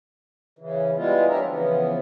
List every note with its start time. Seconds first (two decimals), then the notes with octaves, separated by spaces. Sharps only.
0.59 C#3 E3
0.96 G3 G#3 B3 E4 F4
1.28 F3 C#4 D4 G4 A#4 E5
1.44 C#3 E3 F3 B3